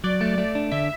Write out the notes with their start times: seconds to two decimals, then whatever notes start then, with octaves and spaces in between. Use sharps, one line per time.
0.04 F#3 D5
0.21 A3
0.38 A3
0.55 D4
0.71 D3 E5